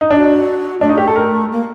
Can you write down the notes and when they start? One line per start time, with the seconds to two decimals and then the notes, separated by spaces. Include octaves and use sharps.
0.01 D#4
0.11 D4 F#4
0.81 A3 D4
0.89 D#4
0.98 G4
1.07 A4
1.16 A#4
1.51 A#3